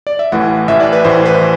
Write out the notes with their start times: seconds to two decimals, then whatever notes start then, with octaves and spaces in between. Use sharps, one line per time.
0.07 D5
0.19 E5
0.32 A1 A2 E3 F#5
0.68 A1 A2 E3 E5
0.80 D5
0.93 B4
1.04 A1 A2 E3 C5
1.26 B4
1.34 C5
1.41 E3